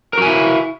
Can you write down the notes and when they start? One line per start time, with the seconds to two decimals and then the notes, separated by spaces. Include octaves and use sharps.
0.13 A#4
0.17 F#4
0.22 G#5
0.26 E4